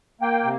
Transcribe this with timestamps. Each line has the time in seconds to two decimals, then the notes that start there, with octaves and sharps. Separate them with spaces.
0.21 A#3 G5
0.44 C3